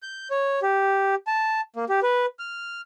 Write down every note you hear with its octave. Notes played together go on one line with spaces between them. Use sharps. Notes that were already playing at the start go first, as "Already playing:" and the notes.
G6
C#5
G4
A5
A#3
G4
B4
F6